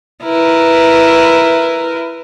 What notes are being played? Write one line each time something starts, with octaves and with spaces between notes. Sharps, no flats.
E4 A#4 B4